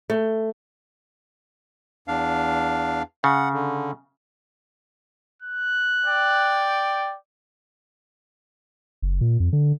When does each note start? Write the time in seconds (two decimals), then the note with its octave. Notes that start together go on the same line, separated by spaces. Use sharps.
0.10 A3
2.08 E2 D4 F5
3.24 C#3 F#5
3.53 D3
5.42 F#6
6.05 D5 G5
9.02 F#1
9.21 A#2
9.40 F2
9.53 D3